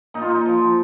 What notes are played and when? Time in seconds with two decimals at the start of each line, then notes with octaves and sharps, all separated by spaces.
0.14 A#2 D#4
0.22 F4
0.29 A#2 D#4
0.46 F3
0.62 F3